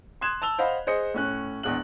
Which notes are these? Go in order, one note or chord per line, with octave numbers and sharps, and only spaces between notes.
C6 D#6 F#6 G#6 E7
A5 E6 F7 G7
C5 D#5 F5 F#5 B5
G#4 C5 D#5 C#7
A2 C#4 F#6
A#1 E2 G#3 F#6 F#7